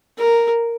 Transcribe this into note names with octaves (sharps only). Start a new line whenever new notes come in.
A#4